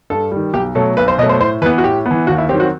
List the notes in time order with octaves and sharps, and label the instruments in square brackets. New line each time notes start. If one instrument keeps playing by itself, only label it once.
[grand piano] G2 [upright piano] A4
[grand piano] D#3 G3
[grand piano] B1 [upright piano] G4
[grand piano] B2 F#3 A3 [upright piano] A4
[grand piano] B1 [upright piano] B4
[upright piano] C5
[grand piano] B2 F#3 A3 [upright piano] D#5
[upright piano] C5
[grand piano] A2 [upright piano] C5
[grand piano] E3 [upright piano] B4
[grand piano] B3
[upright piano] F#4
[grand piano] A2 [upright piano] G4
[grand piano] B3
E3
[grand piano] D#2 [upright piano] F#4
[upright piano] E4
[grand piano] D#3 F#3 C4 [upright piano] G4
[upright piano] F#4